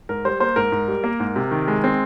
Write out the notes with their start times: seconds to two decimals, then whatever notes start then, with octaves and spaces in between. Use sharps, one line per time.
0.09 G#2 A#4
0.25 G3 C5
0.40 A#3 C5
0.56 G#2 A#4
0.72 G#2
0.88 G3
1.04 A#3
1.20 G#2
1.36 C3
1.51 D#3
1.68 G#3
1.84 C4